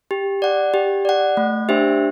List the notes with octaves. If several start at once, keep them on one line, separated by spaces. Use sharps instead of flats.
G4
D5 F#5
G4
D5 F#5
A3
D4 G4 C5 E5